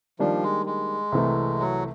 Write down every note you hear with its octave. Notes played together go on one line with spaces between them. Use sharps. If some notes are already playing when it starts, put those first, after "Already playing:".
D#3 F3 G3 A#3 D4
G#3
G#3
C2 C3 E3 A3
F#3